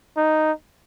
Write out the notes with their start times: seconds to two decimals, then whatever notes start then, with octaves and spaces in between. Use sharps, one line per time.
0.17 D#4